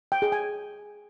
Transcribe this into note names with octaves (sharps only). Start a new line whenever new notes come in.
G5
G#4
G#5